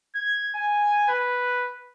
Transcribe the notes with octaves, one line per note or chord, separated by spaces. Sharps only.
G#6
G#5
B4